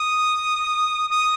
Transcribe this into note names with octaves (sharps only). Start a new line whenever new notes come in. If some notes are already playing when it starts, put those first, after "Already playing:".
Already playing: D#6
D#6